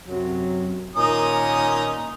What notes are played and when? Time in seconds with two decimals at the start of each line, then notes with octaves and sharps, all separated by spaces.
0.07 F#2 C3 F#3
0.96 A#2 D#3 C#4 D#4 D#6